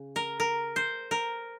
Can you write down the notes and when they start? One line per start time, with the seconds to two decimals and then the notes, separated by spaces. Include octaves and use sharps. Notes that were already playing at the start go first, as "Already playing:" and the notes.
Already playing: C#3
0.16 A#4
0.40 A#4
0.76 C5
1.11 A#4